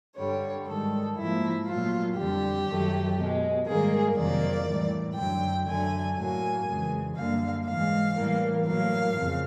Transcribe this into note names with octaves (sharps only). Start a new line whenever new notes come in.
G2 D3 G3 C#5
G#2 D#3 G3 A4
G#2 F3 A#3 E4
A#2 F#3 A3 F4
F2 D3 G3 G4
F#2 D#3 F#3 A3
B2 G#3
G#2 D#3 G3 A#3 G#4
F2 C3 D#3 F#3 A#3 D5
A2 E3 G3
F#2 D3 F#3 G5
F#2 D3 F#3 A3 G#5
A2 F#3 A#3 G#5
F2 C#3 E3 G#3
F#2 D3 G3 A#3 F5
G#2 E3 G#3 F5
A2 E3 G3 A#3
A2 F#3 A#3 F5
F2 C#3